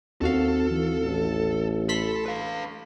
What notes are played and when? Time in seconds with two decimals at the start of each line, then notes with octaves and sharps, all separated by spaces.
0.21 D#2 C4 F#4 A4 F5
0.71 E3
1.03 A1
1.89 A4 B5 C6 B6
2.26 B4 F5